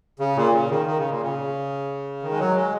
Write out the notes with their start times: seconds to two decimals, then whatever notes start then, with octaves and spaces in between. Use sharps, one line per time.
0.19 C#3
0.36 A#2
0.53 C#3
0.70 D#3
0.86 D#3
0.98 C#3
1.10 A#2
1.22 C#3
2.22 D#3
2.31 G#3
2.39 F#3
2.56 G#3